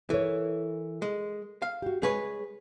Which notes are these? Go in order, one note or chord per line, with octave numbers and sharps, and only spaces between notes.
E3 A4 A#4 C#5
G#3
F5
F#4 G4
G#3 G#4 B4 C#5